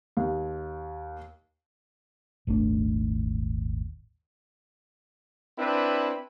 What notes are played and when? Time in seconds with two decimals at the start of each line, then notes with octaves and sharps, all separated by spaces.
0.17 D#2
2.47 D#1 G#1 A3 D4
5.57 C4 D4 E4 B4